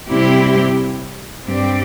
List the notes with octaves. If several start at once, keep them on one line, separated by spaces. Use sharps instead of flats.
C3 G3 C4 E4 G4
G2 G3 C4 G4 D5